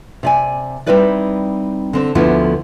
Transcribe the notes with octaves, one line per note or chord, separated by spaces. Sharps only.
C3 D5 G#5
G3 C4 D#4 E4 B4 D5
D3 C4 D4
D2 D3 F3 B3 E4